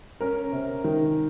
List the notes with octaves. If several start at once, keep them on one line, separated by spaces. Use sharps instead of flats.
C#4 A#4
C3
D#3